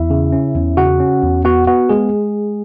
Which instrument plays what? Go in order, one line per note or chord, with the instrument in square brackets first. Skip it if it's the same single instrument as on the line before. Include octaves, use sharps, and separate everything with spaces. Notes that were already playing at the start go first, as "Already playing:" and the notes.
Already playing: [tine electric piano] E2 E4 E5
C#3
C#4
E2
C#3 F#4 F#5
C#4
E2
B3 F#4 F#5
B3 F#4 F#5
G#3 G#4